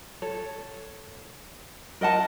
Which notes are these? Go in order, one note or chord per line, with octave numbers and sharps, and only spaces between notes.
A4 C#5
A#4 D#5 F#5 A5